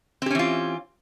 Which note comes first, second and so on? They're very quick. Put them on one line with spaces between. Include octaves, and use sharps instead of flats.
C4 G4 C#4 E3 F4